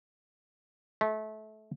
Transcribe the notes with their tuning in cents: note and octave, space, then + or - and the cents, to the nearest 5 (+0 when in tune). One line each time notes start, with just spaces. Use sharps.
A3 -25